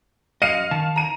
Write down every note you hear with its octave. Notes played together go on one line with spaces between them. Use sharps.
F#2 D#5 F5 C#7 D#7
D#3 A5
A#5 D#7